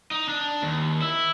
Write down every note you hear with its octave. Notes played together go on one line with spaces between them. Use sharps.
D#4
D4
D#2
E4